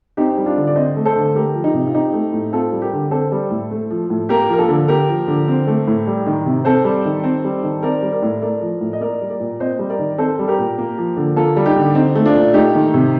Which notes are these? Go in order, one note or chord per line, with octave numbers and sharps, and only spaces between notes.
C4 D#4 G4
G3
D4 F4
D3
D5
C4 C5 D#5
A3
A4 C5
D3
A3 G4 A#4
F3
D#4 G4
C3
F4
C4 D#4 G4
A3
A2
C4 F4 A4
G3
G4 A#4
D3
C4 A4 C5
G3
A2
A3
F3
A2
A#3 G4 A#4
F3 A#4
F4 A4
D3
A#3 G4 A#4
F3
D3
C4
A3
A2
G3
D#3
C3
C4 A4 C5
G3
D#3
C4
G3
D#3
C4 A#4 D5
G3
A#4 D5
A2
A3 A#4 D5
F3
A2
D#5
A#3 A#4 D5
G3
A#4 D5
A#2
C4 C5 D#5
G3
A#4 D5
D#3
C4 A4 C5
G3
G4 A#4
A#2
A#3
F3
D3
A#3 F4 A4
G3
D#4 G4
D3
C4 D#4
A3
D4 F4
A#2
A3 D#4 G4
D#3
C3